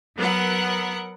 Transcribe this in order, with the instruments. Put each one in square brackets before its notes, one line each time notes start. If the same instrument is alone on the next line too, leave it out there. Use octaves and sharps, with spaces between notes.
[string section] F#3 B3 A#4 F#5